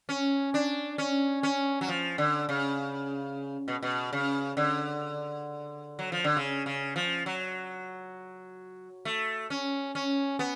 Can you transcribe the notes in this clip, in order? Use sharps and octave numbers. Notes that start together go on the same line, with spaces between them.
C#4
D4
C#4
C#4
F#3
F3
D3
C#3
B2
B2
C#3
D3
F#3
F3
D3
C#3
C#3
F3
F#3
A3
C#4
C#4
B3